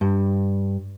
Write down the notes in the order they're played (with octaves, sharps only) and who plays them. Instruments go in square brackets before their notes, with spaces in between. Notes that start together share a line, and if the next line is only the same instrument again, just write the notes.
[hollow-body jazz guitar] G2